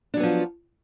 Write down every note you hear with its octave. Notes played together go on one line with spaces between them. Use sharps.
F3 F#3 B3 D4